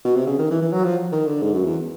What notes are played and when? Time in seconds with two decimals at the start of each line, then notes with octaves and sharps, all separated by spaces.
0.05 B2
0.16 C3
0.27 C#3
0.39 D#3
0.51 E3
0.62 E3
0.72 F#3
0.84 F3
1.12 D#3
1.26 D3
1.42 G#2
1.53 F#2
1.65 E2